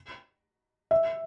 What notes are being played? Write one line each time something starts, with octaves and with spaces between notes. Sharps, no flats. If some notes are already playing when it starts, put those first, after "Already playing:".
E5